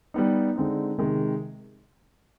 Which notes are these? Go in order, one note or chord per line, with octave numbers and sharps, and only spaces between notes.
G3 B3 D#4
D3 G#3 C4 D#4
C3 D#3 G#3